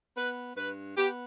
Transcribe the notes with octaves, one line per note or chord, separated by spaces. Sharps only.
B3 B4
G2 B4
B3 G4